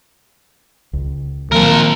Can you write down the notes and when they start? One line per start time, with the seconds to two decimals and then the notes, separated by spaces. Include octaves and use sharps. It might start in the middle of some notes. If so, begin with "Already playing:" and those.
0.93 C#2
1.52 D#3 F3 F#3 A#3 C4 A#4